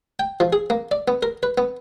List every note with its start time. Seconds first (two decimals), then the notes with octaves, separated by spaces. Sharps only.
0.19 G5
0.40 F3
0.53 G#4
0.70 A#3
0.91 D5
1.08 B3
1.23 A#4
1.43 B4
1.58 B3